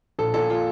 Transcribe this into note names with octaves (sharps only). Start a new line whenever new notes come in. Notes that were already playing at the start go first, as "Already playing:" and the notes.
A#1 A4
A#2 A4
F4